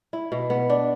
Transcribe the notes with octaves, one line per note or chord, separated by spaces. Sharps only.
E4
B2
B3
D4